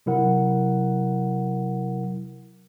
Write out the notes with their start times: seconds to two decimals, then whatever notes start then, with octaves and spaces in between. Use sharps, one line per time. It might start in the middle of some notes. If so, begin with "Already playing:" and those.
0.06 C3 F#3 E4 A#4 F#5